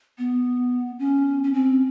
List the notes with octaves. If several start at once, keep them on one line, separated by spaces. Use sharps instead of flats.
B3
C#4
C#4
C4